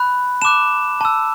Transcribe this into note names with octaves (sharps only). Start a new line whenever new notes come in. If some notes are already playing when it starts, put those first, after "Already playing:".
Already playing: B5 F#6
A5 D6 F#6 E7
A5 E6